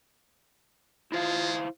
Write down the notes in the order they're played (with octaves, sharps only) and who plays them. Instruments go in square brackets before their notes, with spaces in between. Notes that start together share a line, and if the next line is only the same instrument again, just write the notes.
[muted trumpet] G#3 [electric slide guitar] E4 C5 F5 [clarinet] F4